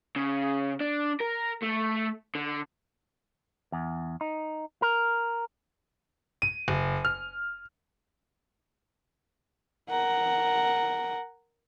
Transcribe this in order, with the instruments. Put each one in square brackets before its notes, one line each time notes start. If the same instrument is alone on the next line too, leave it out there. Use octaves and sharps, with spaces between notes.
[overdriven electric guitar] C#3
D4
A#4
A3
D3
[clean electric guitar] E2
D#4
A#4
[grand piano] D#7
F#1
F6
[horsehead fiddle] A#4 F#5